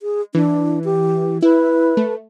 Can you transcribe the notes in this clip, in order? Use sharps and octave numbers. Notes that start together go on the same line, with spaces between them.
G#4
E3 D4
G4
E4 B4
A3